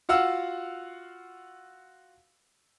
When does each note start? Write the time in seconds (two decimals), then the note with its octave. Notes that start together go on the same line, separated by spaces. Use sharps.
0.09 F4 F#4 F5 F#5 E6